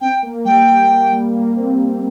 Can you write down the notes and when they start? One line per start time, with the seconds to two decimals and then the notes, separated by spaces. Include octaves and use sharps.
0.01 C4 G5
0.23 A#3
0.45 G3 G5
0.59 G3
0.68 A#3
0.90 A#3
1.12 G3
1.35 A#3
1.56 C4